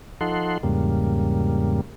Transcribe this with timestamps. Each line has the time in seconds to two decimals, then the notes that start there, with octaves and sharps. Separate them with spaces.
0.21 F3 D#4 A4 F#5 C6
0.63 E2 G#2 C#3 G3 A#3